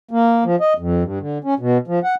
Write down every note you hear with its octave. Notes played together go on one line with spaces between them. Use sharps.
A#3
F3
D#5
F2
G2
D3
C#4
B2
F3
F#5